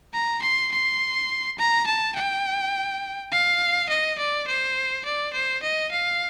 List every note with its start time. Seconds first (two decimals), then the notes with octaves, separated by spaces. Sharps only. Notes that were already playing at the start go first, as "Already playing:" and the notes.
0.13 A#5
0.42 C6
0.72 C6
1.58 A#5
1.86 A5
2.15 G5
3.31 F5
3.89 D#5
4.18 D5
4.47 C5
5.05 D5
5.33 C5
5.63 D#5
5.91 F5